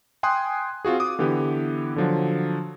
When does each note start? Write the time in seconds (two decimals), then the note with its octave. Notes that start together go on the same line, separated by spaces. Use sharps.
0.23 G5 G#5 C6 D#6 F#6
0.85 C4 F4 F#4 G#4
1.00 D6 D#6
1.19 D3 E3 B3 G4
1.96 D3 F3 F#3